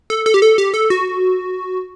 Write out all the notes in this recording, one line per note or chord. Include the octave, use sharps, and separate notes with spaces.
A4
A4
G4
A4
G4
A4
F#4